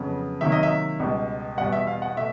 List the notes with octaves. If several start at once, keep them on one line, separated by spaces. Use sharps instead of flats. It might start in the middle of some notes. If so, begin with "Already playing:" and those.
Already playing: F2 C#3 F#3 B3
C3 D#3 F#3 A#3 E5
D#5
E5
C#2 B2 G3
E2 B2 G3 F#5
E5
F5
F#5
B2 A3 E5